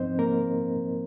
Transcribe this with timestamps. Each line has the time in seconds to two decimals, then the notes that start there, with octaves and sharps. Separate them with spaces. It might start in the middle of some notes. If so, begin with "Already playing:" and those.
Already playing: G#2 F3 C4 D#4 C5 D#5
0.19 A#3 A#4